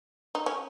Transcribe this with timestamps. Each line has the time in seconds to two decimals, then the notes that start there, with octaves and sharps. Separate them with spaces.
0.35 D#4
0.46 C#4